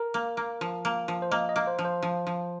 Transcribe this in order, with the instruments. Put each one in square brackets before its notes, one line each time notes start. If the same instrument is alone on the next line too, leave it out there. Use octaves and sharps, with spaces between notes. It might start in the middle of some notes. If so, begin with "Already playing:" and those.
Already playing: [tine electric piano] A#4
[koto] A#3
A#3
F3
A#3
F3
[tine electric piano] C5
[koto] A#3 [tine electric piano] D#5
[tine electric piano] D#5
[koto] A#3
[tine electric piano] C5
[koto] F3
[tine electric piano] C5
[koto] F3
F3